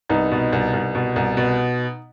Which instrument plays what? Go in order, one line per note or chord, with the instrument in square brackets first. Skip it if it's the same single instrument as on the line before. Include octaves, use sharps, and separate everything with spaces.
[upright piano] C2 B3 D#4
B2
C2
C2
B2
C2
B2